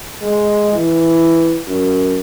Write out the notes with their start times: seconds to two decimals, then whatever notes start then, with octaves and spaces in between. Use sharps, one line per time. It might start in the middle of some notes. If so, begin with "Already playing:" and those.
0.21 G#3
0.73 E3
1.67 F#2